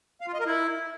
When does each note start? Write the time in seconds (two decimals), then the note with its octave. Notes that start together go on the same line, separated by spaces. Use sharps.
0.21 F5
0.27 F4
0.34 D#5
0.40 A#4
0.46 E4